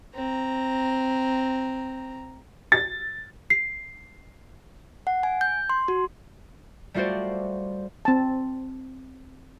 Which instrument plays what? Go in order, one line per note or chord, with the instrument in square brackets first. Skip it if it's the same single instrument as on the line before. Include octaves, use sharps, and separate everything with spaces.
[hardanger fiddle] C4 A#5
[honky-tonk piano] A6
[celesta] C7
[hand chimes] F#5
G#5
G6
C6
F#4
[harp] G3 A3 F4 F#4 C5 D5
[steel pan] C4 A5